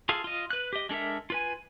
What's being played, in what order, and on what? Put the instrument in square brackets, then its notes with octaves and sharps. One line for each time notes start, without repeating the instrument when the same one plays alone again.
[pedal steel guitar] F4 G#4 A4 F5
F4 D#5
B4 F#6
G4 D#5
G#3 D4 A4 A#4 E5
F4 B4 G#5